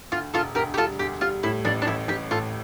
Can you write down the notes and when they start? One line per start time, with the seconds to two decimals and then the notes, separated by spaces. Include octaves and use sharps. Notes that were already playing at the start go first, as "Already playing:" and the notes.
0.12 D2 F4
0.33 E1 F4 A4
0.55 D2 G4 A#4
0.74 G4
0.77 G3 F4 A4
0.99 D2 G4
1.21 G3 F4
1.43 A2 E4
1.65 A1 D4
1.82 D4
1.87 A1 E4
2.08 A1 G4
2.31 A2 F4 A4